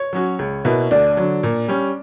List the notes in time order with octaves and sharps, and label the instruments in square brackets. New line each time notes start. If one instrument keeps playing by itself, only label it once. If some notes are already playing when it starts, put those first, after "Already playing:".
Already playing: [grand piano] C#5
[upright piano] F#3 C#4 F#4
C#2
B2 A#3 E4 B4
[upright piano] D2 [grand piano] D4
[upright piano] D3 F#3
A#2
G3 C#4